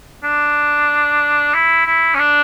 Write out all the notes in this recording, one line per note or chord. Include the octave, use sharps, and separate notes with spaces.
D4
E4
E4
C#4
D4